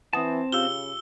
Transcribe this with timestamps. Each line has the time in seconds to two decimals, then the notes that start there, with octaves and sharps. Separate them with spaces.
0.13 E3 C4 F#5 A5 D#6
0.52 C#3 F4 G4 F5 E6 G7